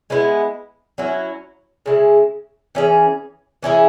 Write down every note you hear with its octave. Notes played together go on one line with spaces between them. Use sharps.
G#3 B3 E4
F#3 C#4 E4
C#3 G#3 E4
E3 C#4 G#4
E3 C#4 E4 G#4